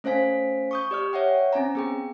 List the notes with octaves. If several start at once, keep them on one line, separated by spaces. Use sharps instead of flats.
A3 C#4 C5 F5 G#5 B6
C#6 D#6 G6
G4 D5 F6
C#5 E5 F#5 G5
C4 C#4 G#5 A#5
B3 G#4 G5